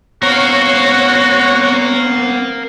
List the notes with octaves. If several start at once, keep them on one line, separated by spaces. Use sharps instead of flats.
B3 C4 F#4 A#4 C#5 F5